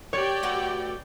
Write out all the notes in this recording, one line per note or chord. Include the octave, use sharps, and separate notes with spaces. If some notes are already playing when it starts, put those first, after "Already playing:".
G4 C#5 D5 G5
A3 F#4 B4